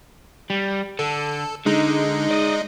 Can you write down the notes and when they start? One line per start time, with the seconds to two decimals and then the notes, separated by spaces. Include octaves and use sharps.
0.50 G3
0.99 D3 A4
1.66 D3 G#3 D#4
2.31 D5 D#5